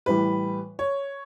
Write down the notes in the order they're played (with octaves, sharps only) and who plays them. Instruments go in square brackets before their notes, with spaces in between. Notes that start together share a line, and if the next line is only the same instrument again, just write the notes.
[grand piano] A2 E3 G3 [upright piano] B4
[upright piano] C#5